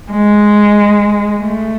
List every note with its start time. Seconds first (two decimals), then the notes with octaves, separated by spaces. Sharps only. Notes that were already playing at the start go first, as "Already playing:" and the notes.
0.12 G#3
1.40 A3